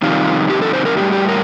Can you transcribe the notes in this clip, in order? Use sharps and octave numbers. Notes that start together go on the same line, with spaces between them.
F2 C3 D#3 G3 F4
G4
A4
C5
A#4
A2 G3 G4
G4
A#4